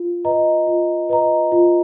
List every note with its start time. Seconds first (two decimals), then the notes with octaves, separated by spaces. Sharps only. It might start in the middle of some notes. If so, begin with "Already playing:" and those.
Already playing: F4
0.25 B4 D#5 A#5
0.67 F4
1.09 B4 D#5 A#5
1.52 F4